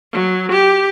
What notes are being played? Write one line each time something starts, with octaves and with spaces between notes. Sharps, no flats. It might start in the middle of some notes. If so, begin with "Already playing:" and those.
F#3
G4